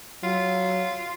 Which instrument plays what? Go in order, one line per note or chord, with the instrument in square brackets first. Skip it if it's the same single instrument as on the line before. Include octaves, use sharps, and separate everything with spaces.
[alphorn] F#3 [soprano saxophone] F4